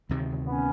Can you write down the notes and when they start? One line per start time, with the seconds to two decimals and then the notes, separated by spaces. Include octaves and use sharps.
0.09 D2 C3 D#3
0.47 B3 C#4